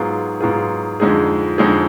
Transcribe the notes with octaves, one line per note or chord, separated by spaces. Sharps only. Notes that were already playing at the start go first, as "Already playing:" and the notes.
Already playing: G#2 F#3 B3 F4 G#4
G#2 F#3 B3 F4 G#4
F2 D3 G#3 D#4 G#4
F2 D3 G#3 D#4 G#4